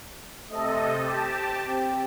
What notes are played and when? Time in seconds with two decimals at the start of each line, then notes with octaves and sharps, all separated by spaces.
0.48 C3 A3 A4 D#5
0.96 G4 C5 A5
1.65 C4 G4